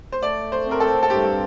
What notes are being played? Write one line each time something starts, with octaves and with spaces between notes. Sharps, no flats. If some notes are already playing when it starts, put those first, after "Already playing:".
C5
A3 D5
C5
C4
A#4
A4
A4
G2 G4